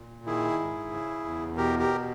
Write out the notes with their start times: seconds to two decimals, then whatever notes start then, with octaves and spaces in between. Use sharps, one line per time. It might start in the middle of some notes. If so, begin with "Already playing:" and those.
Already playing: A#2
0.26 D#3 E4 G#4
0.59 G#2
0.92 C#3
1.25 E2
1.57 B2 G4 A#4
1.79 G4 A#4